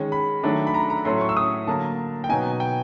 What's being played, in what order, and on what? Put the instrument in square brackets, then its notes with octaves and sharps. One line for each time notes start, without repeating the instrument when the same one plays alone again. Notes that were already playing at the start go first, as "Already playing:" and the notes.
Already playing: [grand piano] D#3 G#3 C#4
B5
D#3 F#3 A3 D4
B5
A#5
A#5
A2 F#3 A3 C#4 C6
C#6
E6
D#6
D3 F#3 A#3 A5
G5
B2 F#3 B3 D#4 G#5
G5